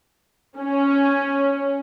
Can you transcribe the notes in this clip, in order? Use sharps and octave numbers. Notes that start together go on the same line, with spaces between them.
C#4